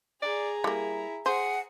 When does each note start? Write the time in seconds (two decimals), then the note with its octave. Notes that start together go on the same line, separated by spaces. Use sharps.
0.22 G#4 D5 A#5
0.64 G3 A#3 E4
1.26 G#4 C5 F#5